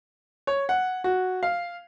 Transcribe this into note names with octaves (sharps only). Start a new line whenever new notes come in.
C#5
F#5
F#4
F5